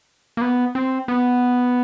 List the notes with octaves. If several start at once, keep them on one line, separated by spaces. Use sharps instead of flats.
A#3
B3
C4
B3